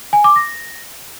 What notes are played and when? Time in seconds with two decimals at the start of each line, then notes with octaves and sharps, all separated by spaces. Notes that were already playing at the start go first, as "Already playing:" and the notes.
0.13 G#5
0.24 D6
0.36 A#6